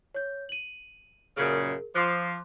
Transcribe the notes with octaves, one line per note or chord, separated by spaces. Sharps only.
C#5 G6
D#7 F#7
F#2 A#2 C#3 G#4 A#4
F3 C6 D6 F#6